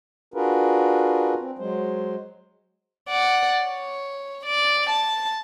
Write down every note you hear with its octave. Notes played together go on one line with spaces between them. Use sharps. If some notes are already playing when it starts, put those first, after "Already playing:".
D4 F4 F#4 G#4 A#4 B4
C4
F#3 G#3 C5
D5 F#5
C#5
D5
A5